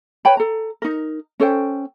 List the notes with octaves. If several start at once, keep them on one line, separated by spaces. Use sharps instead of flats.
B4 C#5 G5 B5
A4 A#5
D#4 A#4
C#4 A4 C5 G5